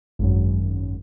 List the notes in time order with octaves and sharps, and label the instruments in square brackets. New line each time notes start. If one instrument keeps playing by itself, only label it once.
[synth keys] G#1 F#2